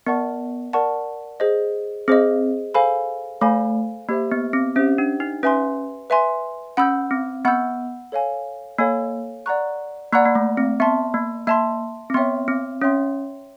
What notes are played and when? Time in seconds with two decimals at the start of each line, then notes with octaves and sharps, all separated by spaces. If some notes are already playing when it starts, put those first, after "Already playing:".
0.06 B3 A#4 D5 F#5 A5 C#6
0.73 A#4 D5 F#5 A5 C#6
1.40 G#4 C5 D#5
2.08 C4 G#4 C5 D#5
2.74 A4 C5 F5 G#5 B5
3.41 A3 A4 C5 F5 G#5 B5
4.09 A#3 G4 C5 E5
4.31 B3
4.53 C4
4.76 C#4 G4 C5 E5
4.98 D4
5.20 D#4
5.43 C#4 B4 E5 G#5 C6
6.10 B4 E5 G#5 C6
6.77 C#4 F#5 B5 E6 G6
7.11 C4
7.45 B3 F#5 B5 E6 G6
8.12 A4 C#5 F5 G#5
8.79 A#3 A4 C#5 F5 G#5
9.46 D5 F#5 A#5 C#6 F#6
10.13 A#3 D5 F#5 A#5 C#6 F#6
10.25 A#3
10.35 A3
10.57 C4
10.80 B3 E5 A5 C6
11.14 A#3
11.47 A#3 E5 A5 C6
12.10 C4
12.14 B3 C#5 E5 G5 C6
12.48 C4
12.81 C#4 C#5 E5 G5 C6